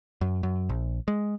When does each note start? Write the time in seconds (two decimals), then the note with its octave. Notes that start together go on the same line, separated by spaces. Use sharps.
0.21 F#2
0.43 F#2
0.69 A#1
1.08 G#3